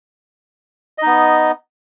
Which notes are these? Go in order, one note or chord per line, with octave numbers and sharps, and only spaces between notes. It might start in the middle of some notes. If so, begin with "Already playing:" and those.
B3 D#4 D#5